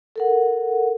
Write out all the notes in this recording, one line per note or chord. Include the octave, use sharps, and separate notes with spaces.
A4 A#4 F#5